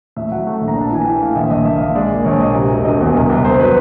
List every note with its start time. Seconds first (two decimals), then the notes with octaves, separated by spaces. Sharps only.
0.16 A2 E5
0.31 F#3 F#5
0.47 A3
0.61 A#1
0.68 A#5
0.76 D4
0.81 A5
0.91 E3 G#5
1.05 E3 G5
1.21 A3 F5
1.36 A#1 E5
1.50 A#1 D#5
1.65 A#1 E5
1.76 F5
1.81 A#1 D#5
1.95 G#3 D5
2.10 A#2
2.25 A#1 C#5
2.40 A#2 D#5
2.55 C3
2.70 E1
2.84 E1 D#5
3.00 E2
3.14 C2
3.29 C2
3.44 C2 C5
3.60 F#3 B4